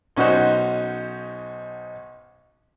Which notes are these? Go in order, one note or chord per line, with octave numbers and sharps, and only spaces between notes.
B1 C#4 D#4 F#4 C5 F#6